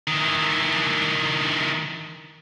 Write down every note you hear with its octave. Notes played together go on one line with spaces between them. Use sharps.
D#3 E3